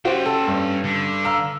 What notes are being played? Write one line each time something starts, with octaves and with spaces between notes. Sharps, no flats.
C#4 F#4 G4 C5 G5
A4
G2
D3
F5 A#5 E6